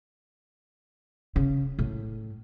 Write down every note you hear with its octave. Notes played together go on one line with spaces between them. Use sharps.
C#3
A2